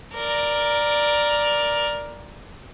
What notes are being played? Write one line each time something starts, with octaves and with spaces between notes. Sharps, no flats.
A#4 D5